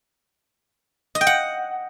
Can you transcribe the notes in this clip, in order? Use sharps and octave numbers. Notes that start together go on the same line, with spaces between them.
D#5
G5
F#5